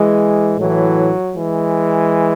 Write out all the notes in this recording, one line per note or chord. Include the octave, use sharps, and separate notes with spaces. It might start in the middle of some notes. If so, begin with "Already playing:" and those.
Already playing: E3 G#3
A2 E3 F#3
E3 G#3